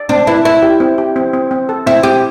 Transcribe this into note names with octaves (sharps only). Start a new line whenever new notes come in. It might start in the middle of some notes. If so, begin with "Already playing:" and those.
Already playing: D5
C4 D4
E4 B4
E4 B4
G4
C4
G4
C4
C4
C4
A4
C4 E4
C4 G4